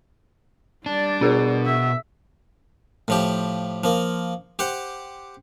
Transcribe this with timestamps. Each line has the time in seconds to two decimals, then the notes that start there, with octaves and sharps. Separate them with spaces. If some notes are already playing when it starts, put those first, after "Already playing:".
0.86 G3 D4 D5
1.21 B2 D4 G#4 A#4
1.66 E5
3.08 A2 F3 G4
3.84 F3 A#3
4.59 G4 C5 F#5